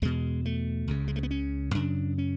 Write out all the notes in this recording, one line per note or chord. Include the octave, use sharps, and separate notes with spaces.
E2 B2 G#3
A3
C#2 C#3
G#3
A3
B3
C#4
F#2 C#3 D4
C#4